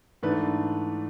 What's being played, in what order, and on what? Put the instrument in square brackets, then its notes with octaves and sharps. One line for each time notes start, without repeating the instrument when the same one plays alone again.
[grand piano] G#2 E3 A3 D4 B4